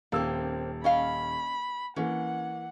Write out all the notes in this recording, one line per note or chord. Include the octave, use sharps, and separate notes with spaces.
D#1 A#3 C4 E6
C#4 D#5 F5 B5
E3 A#3 C#4 F#5